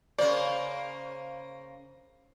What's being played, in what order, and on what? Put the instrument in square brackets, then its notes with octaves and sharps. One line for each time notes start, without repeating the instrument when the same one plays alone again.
[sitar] C#3 A#3 C5 [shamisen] D5